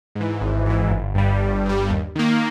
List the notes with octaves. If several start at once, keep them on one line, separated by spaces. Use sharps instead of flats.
G#2 E3
G#1
G#2 E3
G1
G2 G3
G1
G2 G3
D#2
D#3 A#3